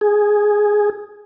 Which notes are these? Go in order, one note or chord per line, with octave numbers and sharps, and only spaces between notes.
G#4